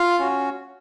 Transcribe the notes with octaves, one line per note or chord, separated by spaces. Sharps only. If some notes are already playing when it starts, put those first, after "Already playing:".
Already playing: F4 F5
C#4 F#4